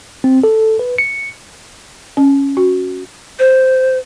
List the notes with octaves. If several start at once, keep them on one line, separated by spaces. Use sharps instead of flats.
C4
A4
B4
C#7
C#4
F#4
C5